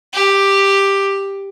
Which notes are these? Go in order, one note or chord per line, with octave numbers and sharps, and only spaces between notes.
G4